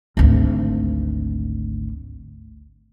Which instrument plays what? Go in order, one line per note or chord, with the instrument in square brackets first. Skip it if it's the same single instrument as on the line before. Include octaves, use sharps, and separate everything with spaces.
[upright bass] G#1 D2